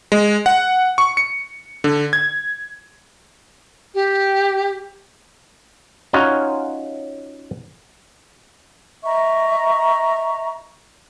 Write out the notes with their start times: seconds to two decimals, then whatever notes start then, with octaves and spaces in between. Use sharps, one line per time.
0.12 G#3
0.46 F#5
0.98 C#6
1.17 C#7
1.84 D3
2.13 G#6
3.94 G4
6.13 C#4 D#4 F4 F#4 C#5
9.04 D#5 E5 A#5 C#6